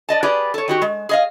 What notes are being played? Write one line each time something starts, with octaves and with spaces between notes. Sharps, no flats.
D5 D#5 A5
G4 G#4 B4 D5
A4 C#5
D#3 F#4 G4
G#3
G#4 D#5 F5